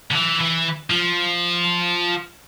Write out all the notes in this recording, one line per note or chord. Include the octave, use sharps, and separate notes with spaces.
D3
E3
E3
F3